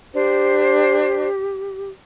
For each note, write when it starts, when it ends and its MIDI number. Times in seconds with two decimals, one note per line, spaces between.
0.14 1.28 62
0.14 1.89 67
0.14 1.28 72